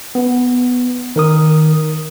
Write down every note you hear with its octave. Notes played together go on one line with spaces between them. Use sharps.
B3
D#3 A#4 D#6